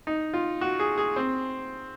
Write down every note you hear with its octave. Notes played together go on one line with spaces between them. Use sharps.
D#4
F4
F#4
G#4
G#4
C4